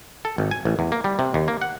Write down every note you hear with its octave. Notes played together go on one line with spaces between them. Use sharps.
A4
G#1
G#5
A1
E2
A#3
G3
C3
D#2
A#3
F#5